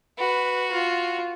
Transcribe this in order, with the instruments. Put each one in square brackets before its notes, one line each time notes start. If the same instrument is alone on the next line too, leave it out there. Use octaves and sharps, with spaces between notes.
[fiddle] F#4 [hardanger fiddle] B4
[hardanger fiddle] F4